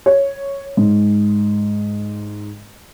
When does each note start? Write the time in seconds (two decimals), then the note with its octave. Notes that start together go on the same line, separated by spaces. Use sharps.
0.06 C#5
0.77 G#2